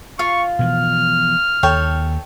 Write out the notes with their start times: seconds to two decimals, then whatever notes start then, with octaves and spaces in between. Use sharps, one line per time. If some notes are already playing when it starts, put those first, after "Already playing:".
0.19 F4 F5 C#6
0.59 B2 E3 F3 F6
1.63 D#2 A4 C#5 G5